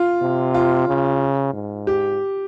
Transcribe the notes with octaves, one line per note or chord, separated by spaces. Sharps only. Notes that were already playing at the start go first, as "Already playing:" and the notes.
Already playing: F4
C3
F4
C#3
G#2
G4